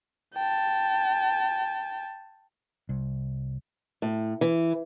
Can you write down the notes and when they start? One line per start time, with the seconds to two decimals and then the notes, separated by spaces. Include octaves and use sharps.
0.35 G5 A5
2.89 C2
4.02 A2
4.41 E3